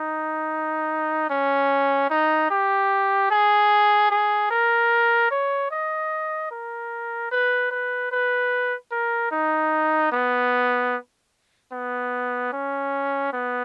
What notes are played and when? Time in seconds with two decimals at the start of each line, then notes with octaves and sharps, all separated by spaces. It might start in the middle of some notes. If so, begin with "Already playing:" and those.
Already playing: D#4
1.30 C#4
2.10 D#4
2.51 G4
3.31 G#4
4.11 G#4
4.51 A#4
5.31 C#5
5.71 D#5
6.51 A#4
7.31 B4
7.71 B4
8.12 B4
8.92 A#4
9.32 D#4
10.12 B3
11.72 B3
12.53 C#4
13.33 B3